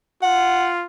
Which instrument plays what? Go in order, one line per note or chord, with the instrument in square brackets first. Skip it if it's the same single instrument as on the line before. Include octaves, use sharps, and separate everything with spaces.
[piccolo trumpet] F4 [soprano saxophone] F#5